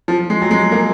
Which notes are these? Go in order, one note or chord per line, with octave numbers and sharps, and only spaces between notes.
F3
G#3
F#3
G#3
A#3